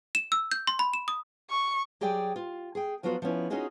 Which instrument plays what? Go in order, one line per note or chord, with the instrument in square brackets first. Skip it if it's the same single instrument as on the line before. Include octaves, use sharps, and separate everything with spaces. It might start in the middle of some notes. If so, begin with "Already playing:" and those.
[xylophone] E7
E6
G6
C6
B5
E7
D#6
[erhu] C#6
[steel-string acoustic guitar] F#3 G4 G#4 D5 G5 G#5
F4
G#4 G5
F3 F#3 B3 F4 F#4
F3 B3 C#4 E4
C#4 D#4 F4 F#4 G#4 D#5